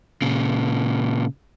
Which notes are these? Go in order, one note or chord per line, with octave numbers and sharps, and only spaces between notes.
A#2 C#3